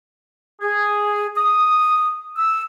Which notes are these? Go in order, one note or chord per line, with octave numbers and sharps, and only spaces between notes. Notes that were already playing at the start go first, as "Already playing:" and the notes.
G#4
D#6
E6